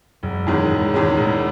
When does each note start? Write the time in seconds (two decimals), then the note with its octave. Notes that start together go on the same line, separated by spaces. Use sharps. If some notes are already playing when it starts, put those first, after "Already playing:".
0.23 E1 F#2
0.47 E2 D#3 G#3 C#4
0.70 E1 G#2
0.93 E2 G#2 D#3 G#3 C#4
1.17 E1 A2